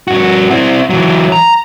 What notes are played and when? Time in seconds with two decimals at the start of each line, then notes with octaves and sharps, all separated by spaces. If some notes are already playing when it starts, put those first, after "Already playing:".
0.08 G2 F#4
0.50 C4 E4
0.90 E3 F#3
1.32 A#5